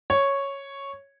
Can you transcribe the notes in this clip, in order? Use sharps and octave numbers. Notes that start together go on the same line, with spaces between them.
C#5